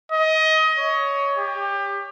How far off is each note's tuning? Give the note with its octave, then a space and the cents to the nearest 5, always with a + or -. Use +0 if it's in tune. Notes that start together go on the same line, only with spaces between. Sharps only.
D#5 +25
C#5 +15
G4 +25